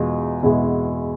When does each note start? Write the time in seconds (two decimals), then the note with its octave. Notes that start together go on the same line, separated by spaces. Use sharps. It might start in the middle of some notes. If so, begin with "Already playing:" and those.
Already playing: E2 B2 G#3 F4
0.43 E2 B2 G#3 E4